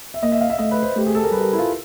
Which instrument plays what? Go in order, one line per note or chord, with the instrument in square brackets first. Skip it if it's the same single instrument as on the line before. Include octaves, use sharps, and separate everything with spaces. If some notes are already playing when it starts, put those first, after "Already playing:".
[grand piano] E5
[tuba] A#3 [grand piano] D#5
[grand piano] E5
F5
E5
[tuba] A3 [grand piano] D#5
[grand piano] B4
C5
[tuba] A3 [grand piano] G4
[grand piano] G#4
A4
A#4
[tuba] G3 [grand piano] B4
[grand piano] A#4
E4
F4